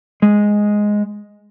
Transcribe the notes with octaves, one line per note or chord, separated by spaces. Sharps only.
G#3